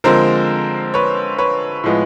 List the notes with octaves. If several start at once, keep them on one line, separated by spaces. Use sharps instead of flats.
D3 F3 G#3 C4 A#4 C5
B4 C#5
B4 C#5
A2 F3 G#3 B3